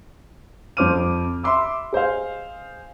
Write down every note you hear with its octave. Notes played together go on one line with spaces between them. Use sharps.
F2 F3 C5 D6 F6 D#7
E5 B5 C6 D6 E6
G#4 C5 D#5 F5